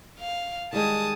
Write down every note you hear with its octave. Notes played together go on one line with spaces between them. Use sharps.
F5
D#3 G3 G#3 A5 D#6